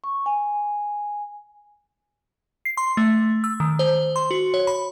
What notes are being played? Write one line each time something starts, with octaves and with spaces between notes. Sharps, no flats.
C#6
G#5
C7
C6
A3
E6
D#3
C5
C6
F#4
C#5
B5